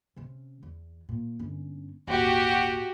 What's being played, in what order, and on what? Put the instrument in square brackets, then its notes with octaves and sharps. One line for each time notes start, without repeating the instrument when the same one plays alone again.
[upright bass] C3 C#4
E2
A#2
G1 C#4
[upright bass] D#1 G#1 [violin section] F#4 G4